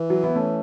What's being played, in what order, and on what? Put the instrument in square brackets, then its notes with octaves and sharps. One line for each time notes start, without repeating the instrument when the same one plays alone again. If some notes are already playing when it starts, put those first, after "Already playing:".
Already playing: [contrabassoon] E3
[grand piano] F#3
B3 E4
A3 C#4